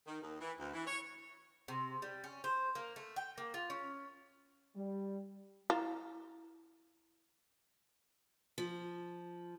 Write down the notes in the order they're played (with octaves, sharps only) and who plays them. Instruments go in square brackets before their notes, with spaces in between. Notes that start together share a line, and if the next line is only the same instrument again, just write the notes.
[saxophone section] D#3
D#2
E3
D2
E3
C#5
[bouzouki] C3
G3
C#4
C5
A#3
A3
G5
A#3
F4
C#4
[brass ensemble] G3
[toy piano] E4 A#5 [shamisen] F4
[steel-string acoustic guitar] F3